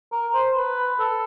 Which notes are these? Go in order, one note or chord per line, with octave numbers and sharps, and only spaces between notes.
A#4
C5
B4
A4